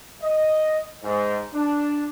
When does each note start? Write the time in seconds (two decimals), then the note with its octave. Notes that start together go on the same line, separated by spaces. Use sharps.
0.22 D#5
1.03 G#2
1.54 D4